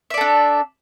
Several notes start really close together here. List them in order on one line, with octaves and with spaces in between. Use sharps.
E5 D5 A4 D4